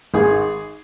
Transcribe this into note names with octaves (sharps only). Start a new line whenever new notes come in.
G#1 G#4